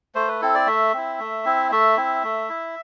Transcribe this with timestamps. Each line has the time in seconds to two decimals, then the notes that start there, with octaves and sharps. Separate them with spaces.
0.15 A3 C5
0.28 B4
0.41 C4 E4 A4
0.54 D5
0.67 A3 E5
0.94 C4 E4
1.19 A3
1.45 C4 E4
1.71 A3 E5
1.97 C4 E4
2.23 A3
2.49 E4